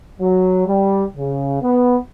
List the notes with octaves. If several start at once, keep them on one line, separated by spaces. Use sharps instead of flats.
F#3
G3
C#3
B3